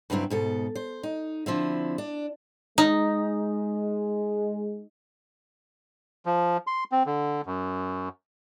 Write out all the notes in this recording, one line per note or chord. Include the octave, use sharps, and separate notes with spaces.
G2 C#3 F#3 C4 E4
G#2 B2 A4
C5
D#4
D3 F3 C4 E4
D4
G#3 D#4
F3
C6
C4
D3
F#2